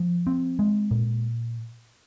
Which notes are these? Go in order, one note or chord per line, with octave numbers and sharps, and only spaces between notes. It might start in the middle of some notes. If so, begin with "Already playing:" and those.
Already playing: F3
C4
G#3
A#2